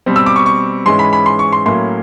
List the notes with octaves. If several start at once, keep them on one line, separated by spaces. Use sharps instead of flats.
B2 G3 C4
E6
D6
C#6
C#6
G#2 E3 G#3 C#4 C6
B5
B5
C6
C#6
C6
A2 F#3 A#3 C#4 E4 C6